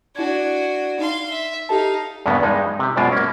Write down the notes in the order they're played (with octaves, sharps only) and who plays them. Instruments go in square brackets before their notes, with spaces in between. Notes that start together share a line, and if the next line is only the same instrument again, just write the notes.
[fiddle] D4 F#4 [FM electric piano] E4 G#6
[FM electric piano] D#4 [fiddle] F5 C6
[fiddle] E5
[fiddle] D#4 F5 [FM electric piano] G4 A4 A5
[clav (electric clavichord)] E2 G2 C#3 A#3 B3
G2 G#3 D#4
C3 G4
F#2 B2 G#3 F4 C5 D5
A#3 C#4